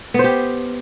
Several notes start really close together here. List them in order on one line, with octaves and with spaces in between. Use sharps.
B3 C5 G4